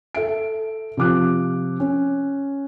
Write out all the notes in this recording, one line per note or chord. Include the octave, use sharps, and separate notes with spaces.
A4 E5 D7
C3 F3 D6 F#6
C#4